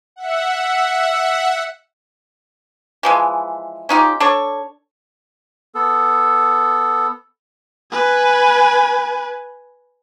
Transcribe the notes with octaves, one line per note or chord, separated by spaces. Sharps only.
E5 F#5
E3 F3 G#3
C#4 D#4 F4 G4
D4 A4 C#5
B3 A4
B4 G#5